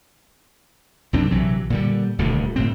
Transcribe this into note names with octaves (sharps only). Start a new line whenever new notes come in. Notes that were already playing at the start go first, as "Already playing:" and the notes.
C2 F#2 C4 D4
A#1 C3 E3 F#3
A#2 D3 G3
D#1 D2 B2 D3
G1 A2 C4